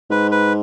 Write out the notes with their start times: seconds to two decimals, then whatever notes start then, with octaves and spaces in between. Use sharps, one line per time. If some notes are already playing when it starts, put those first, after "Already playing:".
0.11 G#2 B4
0.31 B4